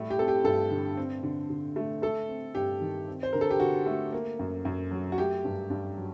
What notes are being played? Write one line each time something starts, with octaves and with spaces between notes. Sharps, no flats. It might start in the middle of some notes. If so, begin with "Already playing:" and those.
Already playing: A2 G3 A3
G4
C4 A4
G4
G2 A4
D3
C4
D3
D3
A3
A3 A4
C4
G2 G4
D#3
C4
C5
D3 A#4
A4
G4
D3 F#4
A3
A#3
F#2
F#2
F#3
F#4
A3 G4
G2
G2
F#3